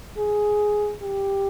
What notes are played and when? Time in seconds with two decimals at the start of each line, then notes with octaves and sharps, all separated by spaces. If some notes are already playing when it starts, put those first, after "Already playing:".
0.18 G#4
1.03 G4